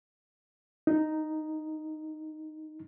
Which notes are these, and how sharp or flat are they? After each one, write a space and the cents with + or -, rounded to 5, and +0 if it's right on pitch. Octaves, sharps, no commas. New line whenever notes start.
D#4 -5